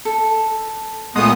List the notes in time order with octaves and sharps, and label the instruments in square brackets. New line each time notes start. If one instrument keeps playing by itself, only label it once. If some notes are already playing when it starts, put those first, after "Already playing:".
[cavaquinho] A4
[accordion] A#2 B3 D#6 [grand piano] G#3 A3